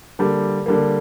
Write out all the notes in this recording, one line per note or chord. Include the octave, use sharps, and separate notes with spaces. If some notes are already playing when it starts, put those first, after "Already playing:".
D3 G3 A#3
D3 G3 A#3